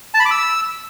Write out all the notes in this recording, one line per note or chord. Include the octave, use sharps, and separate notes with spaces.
A5
B5
D6
E6